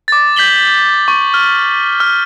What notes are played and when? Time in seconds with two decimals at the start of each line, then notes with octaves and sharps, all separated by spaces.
0.08 D6 A6
0.36 G6 B6 F#7 G7
1.08 C#6
1.34 F6
2.00 F6